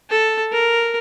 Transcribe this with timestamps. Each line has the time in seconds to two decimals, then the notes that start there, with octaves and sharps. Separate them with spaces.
0.10 A4
0.52 A#4